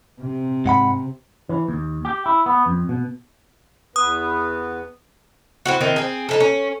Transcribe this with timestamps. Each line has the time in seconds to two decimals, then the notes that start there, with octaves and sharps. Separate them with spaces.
0.21 C3
0.66 G#2 F#5 B5
1.49 E3
1.68 D#2
2.05 G4
2.26 E4
2.46 B3
2.66 F2
2.89 B2
3.96 E2 B3 B4 D#6
5.66 C4 E4 F#4
5.81 D#3 C4 E4
5.96 C4 G#4
6.29 D#4 E4 A4
6.41 C#4